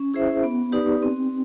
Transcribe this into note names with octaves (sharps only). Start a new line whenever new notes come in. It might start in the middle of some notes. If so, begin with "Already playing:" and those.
Already playing: C#4
E4 G#4 C5 E5
B3
D#4 G4 B4 D5
C4